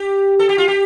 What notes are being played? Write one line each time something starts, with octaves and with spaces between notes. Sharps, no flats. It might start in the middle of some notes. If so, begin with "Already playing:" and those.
Already playing: G4
A4
G4
F4
G4